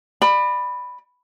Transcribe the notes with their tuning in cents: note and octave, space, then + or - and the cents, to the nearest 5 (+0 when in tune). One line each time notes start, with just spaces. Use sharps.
D5 +35 B5 +0